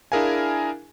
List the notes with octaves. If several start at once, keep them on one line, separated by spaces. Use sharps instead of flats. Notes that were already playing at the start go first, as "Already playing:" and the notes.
D4 E4 G#4 A#4 F5 G#5